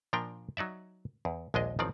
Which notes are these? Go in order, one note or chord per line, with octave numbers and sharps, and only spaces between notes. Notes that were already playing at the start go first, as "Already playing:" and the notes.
A#2 F3 D4 A#4 G5
F#3 D#4 D5 E5
E2
A#1 D#2 G#3 D4 D#5
A1 D#3 F3 C4 D5